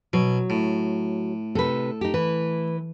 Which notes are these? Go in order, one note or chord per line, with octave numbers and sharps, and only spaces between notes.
B2 F#3
A2
C3 A4 B4
D#4 G4
E3 B4